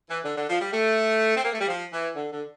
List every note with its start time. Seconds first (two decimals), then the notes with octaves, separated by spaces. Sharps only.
0.09 E3
0.25 D3
0.37 D3
0.49 F3
0.61 G3
0.73 A3
1.37 C4
1.45 A#3
1.53 A3
1.60 G3
1.68 F3
1.93 E3
2.16 D3
2.32 D3